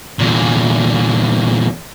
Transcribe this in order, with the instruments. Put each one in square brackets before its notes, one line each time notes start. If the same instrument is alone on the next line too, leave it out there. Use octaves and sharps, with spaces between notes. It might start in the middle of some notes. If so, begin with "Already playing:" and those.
[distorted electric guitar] E2 A#2